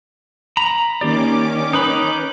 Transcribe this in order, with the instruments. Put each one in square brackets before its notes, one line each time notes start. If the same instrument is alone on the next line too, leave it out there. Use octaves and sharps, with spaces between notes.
[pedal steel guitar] A#5 B5
[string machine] D#3 C#4 D6 [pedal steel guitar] A#3 G4 D5
[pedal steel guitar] D#4 B4 B5